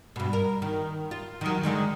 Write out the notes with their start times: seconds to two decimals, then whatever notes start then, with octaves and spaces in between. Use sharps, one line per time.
0.16 G2 B2
0.33 A#4
0.62 D#3
1.11 F4
1.41 D#3 F#3
1.63 D3 D#3 G#3